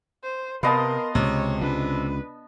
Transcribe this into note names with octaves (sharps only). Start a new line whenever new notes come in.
C5
C3 B3 A#4 D#5 F5 A5 C6
C#2 C3 C#5
C#2 D4 B4